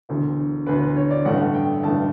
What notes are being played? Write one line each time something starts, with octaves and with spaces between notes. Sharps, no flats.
E1 D2 D3
E1 D2 D3 B4
B4
C#5
D5
A1 G2 D3 A3 F#5
G5
A1 G2 D3 A3 A5